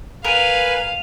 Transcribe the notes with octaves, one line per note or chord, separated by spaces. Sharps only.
A#4 B4 F5 G#5 D#7 F7